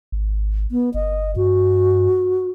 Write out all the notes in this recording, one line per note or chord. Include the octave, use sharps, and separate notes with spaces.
G#1
B3
G1 D#5
G2 F#4